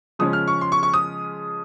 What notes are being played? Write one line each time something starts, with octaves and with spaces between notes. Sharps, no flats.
C#3 F3 G#3 C#4 D#6
F6
C#6
C6
C#6
C#6
D#6